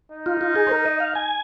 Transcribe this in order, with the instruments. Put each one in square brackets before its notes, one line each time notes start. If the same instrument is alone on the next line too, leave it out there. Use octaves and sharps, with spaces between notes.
[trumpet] D#4
[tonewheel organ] F4
F4
G#4
C5
A#4
D#5
F5
G#5